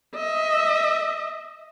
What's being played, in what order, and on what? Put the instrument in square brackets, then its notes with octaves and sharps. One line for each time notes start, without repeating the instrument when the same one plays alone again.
[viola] D#5 E5